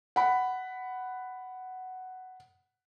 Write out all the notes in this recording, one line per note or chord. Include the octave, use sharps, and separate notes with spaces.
F#5 B5